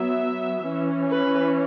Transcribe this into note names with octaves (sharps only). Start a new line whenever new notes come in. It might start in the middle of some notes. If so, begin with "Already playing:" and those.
Already playing: F#3 B3 E5
E3 C#4
B4